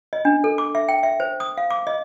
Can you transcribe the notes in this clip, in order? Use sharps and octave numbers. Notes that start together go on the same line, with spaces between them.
D#5
D4
A4
D6
E5
G5
E5
C5
D#6
F5
D6
D#5